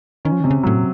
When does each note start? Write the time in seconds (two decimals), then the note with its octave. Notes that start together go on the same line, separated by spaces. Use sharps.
0.25 D#3 C#4
0.32 F3
0.41 D#3
0.44 C3
0.51 C#3
0.63 A2 F#3
0.76 A#2